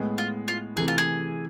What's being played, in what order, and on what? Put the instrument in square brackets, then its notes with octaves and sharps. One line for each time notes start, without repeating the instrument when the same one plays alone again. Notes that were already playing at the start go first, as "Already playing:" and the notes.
Already playing: [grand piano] A2 G#3 B3
[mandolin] F4
F4
[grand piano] C3 E3 A3 [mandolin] G#4
[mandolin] F4
G#4